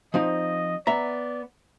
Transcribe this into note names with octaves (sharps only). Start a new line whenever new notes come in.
F3 C4 D#4 D#5
B3 D5 E5 A#5